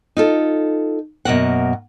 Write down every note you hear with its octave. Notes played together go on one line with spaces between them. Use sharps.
D#4 F4 A4
F#2 B2 A#3 F#5